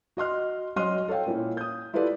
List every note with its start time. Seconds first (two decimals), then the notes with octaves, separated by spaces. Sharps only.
0.17 F#4 D#5 C6 F6
0.76 F#3 C#4 D#5 C6 F6 D#7
1.08 A4 C#5 F5 G5
1.26 A#2 A#3 C#4 E4
1.57 D#6 G6
1.93 E4 F4 G4 A4 B4 D5